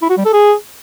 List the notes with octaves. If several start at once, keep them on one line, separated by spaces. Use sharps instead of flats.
E4
F#4
G3
A4
G#4